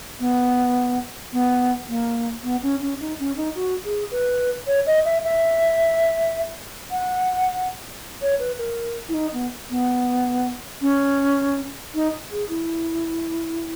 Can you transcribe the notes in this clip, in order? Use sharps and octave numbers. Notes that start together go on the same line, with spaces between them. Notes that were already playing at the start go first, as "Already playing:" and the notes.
B3
B3
A#3
B3
C#4
C#4
D#4
C#4
D#4
F#4
G#4
B4
C#5
D#5
E5
E5
F#5
C#5
B4
A#4
E4
D#4
B3
B3
C#4
D#4
G#4
E4